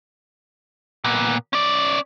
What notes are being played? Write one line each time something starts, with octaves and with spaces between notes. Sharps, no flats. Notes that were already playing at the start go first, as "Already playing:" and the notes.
A#2 B3
C#4 D5